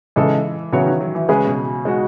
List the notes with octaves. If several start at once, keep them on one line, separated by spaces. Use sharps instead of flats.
C#3 E3 G#3 D#4 A4
C#3 E3 F#3 B3 F#4 C#5
D#3
F#3
E3
C#3 G#3 C#4 G#4 B4
B2
G#3 D#4 F#4